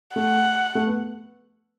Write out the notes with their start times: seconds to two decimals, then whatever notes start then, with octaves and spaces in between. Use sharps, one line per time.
0.16 A3 F#5
0.75 A3
0.87 B3